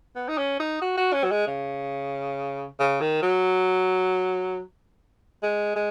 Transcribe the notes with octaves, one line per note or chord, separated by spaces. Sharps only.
B3
D#4
C#4
D#4
F#4
F#4
C#4
F#3
G#3
C#3
C#3
D#3
F#3
G#3
G#3